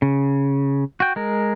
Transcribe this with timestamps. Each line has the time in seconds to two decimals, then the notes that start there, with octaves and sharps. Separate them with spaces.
0.02 C#3
1.00 F#4 G5
1.16 G#3 A#4